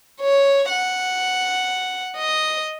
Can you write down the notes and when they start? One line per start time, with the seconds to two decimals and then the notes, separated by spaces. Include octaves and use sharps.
0.21 C#5
0.69 F#5
2.17 D#5